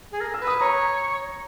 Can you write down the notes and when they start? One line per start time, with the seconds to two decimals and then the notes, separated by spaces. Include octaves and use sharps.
0.12 G#4
0.21 A#4
0.34 E6
0.40 B4
0.47 D#6
0.60 C#5 A#5